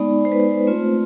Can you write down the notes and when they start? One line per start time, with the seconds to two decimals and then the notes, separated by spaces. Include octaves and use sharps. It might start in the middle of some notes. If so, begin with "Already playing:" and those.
Already playing: G#3 B3 D#4 D5
0.25 C5
0.32 B4
0.40 C5
0.67 A3 C4 F4